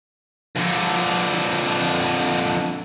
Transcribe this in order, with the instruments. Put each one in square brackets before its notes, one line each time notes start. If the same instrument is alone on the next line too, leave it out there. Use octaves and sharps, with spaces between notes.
[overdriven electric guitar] F2 D3